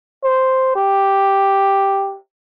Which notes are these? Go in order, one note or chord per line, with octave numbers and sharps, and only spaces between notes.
C5
G4